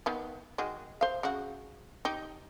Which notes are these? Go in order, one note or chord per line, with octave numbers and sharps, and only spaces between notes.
D#3 B3
D#3 G#3 F#4
C5 F5
C#3 F#4
D#4 G4